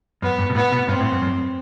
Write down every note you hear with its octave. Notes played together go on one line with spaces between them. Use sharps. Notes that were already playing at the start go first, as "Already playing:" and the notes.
F#2 B3
G2
B2
A2 B3
B2
G2 C4
A2
F#2
F#2